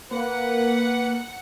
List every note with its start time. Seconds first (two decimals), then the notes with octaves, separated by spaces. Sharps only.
0.11 A#3 B4 F#5